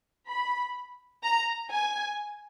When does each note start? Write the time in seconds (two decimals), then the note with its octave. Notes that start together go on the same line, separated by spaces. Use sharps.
0.29 B5
1.23 A#5
1.70 G#5